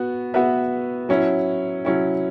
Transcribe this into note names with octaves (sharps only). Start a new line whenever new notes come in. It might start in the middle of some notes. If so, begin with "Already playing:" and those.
Already playing: B3 F#4
B3 F#4 B4 E5
F#3 C#4 E4
F#3 C#4 E4